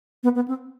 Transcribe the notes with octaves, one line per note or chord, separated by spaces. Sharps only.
B3
B3
C4